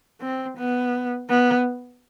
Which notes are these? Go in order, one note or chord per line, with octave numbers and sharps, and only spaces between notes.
C4
B3
B3